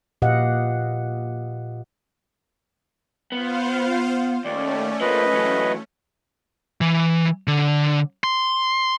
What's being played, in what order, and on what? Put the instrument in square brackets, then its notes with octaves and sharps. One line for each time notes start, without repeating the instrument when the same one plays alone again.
[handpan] A#2 G4 B4 D#5 F5 F#5
[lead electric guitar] B3 [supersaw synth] F4 C5 F5
[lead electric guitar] D#2 [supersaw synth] A3 C#4 [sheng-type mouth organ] D5
[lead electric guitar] F3 A#3 [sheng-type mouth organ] B4 D#5
[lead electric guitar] E3 F#3
E3
D3
C6